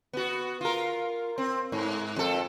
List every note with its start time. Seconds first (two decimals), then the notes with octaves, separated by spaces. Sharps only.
0.13 B3 F#4
0.61 F4 A#4
1.38 C4
1.72 G#2
2.16 F2 A4